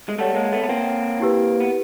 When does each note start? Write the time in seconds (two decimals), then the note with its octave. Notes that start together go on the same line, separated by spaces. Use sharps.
0.09 G#3
0.18 G3 A3 C#5 F#5 A5
0.35 G#3 A#3
0.52 A3 B3
0.63 B3
0.69 A#3 C4
1.20 E4 G4 B4
1.60 B3